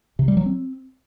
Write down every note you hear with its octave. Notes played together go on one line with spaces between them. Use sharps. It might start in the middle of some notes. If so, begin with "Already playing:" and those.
C3
G3
F#3
C4